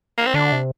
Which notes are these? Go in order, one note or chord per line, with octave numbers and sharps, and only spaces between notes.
A#3
C4
D3 D4
C3